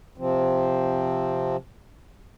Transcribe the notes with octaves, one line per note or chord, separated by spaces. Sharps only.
C3 F3 C4